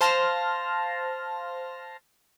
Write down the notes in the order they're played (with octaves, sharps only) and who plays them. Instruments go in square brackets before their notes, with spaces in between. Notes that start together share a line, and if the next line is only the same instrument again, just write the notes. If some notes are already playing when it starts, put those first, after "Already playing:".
[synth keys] C5 F5 A5 C6 F6 A#6